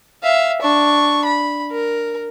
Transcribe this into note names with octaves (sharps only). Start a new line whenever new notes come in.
E5 F5
D4 C#6
B5
A#4